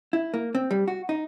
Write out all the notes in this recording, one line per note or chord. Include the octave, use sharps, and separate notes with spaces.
E4
A#3
C4
G3
F#4
D#4